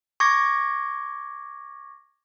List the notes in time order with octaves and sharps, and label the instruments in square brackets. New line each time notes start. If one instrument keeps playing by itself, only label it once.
[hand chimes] C#6 D6 G#6 A#6